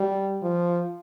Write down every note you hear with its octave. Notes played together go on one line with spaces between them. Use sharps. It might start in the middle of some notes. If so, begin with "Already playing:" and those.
Already playing: G3
F3